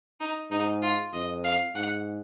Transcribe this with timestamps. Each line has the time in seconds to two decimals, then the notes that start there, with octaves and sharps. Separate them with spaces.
0.20 D#4
0.51 G#2 D#4
0.82 F4
1.13 F2 D#5
1.44 F5
1.75 G#2 F#5